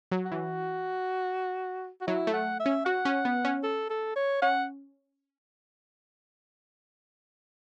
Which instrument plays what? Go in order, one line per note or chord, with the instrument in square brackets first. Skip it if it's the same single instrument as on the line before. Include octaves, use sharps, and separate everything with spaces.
[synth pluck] F#3
[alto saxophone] F#4
[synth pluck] E3
[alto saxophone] F#4
[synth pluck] F#3 [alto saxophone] E4
[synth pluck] A3
[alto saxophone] F#5
E5
[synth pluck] C#4
[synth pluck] F#4 [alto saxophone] F#5
[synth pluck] C#4
B3
C#4
[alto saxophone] A4
A4
C#5
[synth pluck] C#4 [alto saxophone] F#5